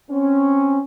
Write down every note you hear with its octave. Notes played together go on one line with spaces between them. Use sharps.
C4 C#4